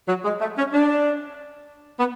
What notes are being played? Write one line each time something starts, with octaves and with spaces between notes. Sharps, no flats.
F#3
G#3
A3
C#4
D4
B3